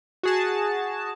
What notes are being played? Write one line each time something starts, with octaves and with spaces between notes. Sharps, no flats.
F#4 G#4 A5